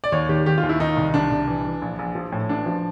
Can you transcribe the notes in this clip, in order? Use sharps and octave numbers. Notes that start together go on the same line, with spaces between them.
D5
D#2 C#5
D#3 G4
D#3 G4
F4
D#2
E4
D#3 D#4
C2
C2 D4
C2
E3
E3
A#1
A#1
F3
A2
A1 D4
F3